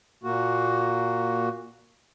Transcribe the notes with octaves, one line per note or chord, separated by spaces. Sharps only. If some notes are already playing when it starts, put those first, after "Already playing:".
A#2 A#3 F#4